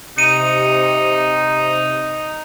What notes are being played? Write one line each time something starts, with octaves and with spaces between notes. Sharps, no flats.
C3 D#4 C#7 D#7